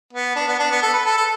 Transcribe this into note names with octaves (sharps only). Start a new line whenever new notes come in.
B3
D4
B3
D4
B3
A4
B4
A4
A4